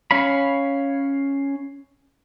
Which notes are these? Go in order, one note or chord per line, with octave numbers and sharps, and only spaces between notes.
C#4 C#5 F5 B5